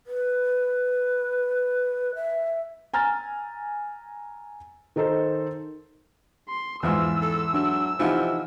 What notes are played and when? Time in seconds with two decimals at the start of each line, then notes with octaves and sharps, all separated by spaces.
0.07 B4
2.16 E5
2.94 G#5 A#5 F6 A6
4.96 D#3 D#4 A4 C5
6.48 C6
6.83 E2 G#2 E3 F3 E6
7.22 A4
7.53 F#3 D4
7.99 C3 E3 F3 D#4 F#5